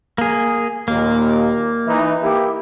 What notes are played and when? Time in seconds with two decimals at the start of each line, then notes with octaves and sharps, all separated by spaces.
0.18 A#3 G#4
0.88 D#2 A#2 A#3
1.86 E3 D#4
2.23 A#3 E4 G4